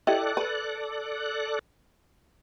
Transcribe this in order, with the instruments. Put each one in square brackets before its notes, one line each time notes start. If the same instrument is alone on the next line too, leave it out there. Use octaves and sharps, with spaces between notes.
[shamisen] E4 G4 D#5 [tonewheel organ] A4 D5 F#6
[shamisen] B4